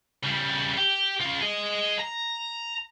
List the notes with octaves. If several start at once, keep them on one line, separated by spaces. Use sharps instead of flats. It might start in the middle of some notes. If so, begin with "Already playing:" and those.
C#3 G3
G4
C#3 F4
G#4 D#5
A#5